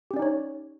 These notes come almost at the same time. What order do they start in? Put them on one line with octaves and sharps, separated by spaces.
G4 C#4 D5 D#4 C#5